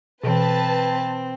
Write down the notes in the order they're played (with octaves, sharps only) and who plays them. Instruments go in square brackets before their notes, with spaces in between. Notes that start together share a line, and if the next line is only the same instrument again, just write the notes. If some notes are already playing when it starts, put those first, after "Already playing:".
[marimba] B2 E3 [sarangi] C4 [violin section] B4 A5